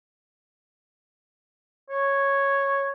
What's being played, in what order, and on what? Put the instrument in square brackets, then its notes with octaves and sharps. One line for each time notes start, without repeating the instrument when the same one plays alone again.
[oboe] C#5